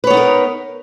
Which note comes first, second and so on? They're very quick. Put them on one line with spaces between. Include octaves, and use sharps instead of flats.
B4 C#5 B3 D#4 A#4